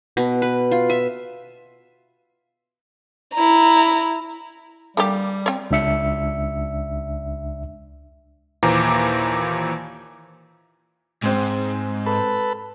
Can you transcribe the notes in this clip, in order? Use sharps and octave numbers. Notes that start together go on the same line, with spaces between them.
B2
B4
F4
E5
E4 A#5
D3 G3 A#3 G4
C4 C#5
C#2 D4 E5 C#7
D#2 A#2 E3 C5 A#5 D6
G#2 G#3 C4
A4 B4